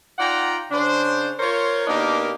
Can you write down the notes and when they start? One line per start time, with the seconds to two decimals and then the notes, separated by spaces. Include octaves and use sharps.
0.19 D#4 F4 D5 F#5 G5 A#5
0.71 C#3 D4 C5
1.39 F4 A#4 C5 C#5
1.87 B2 A#3 D4 D#4 G4 A#4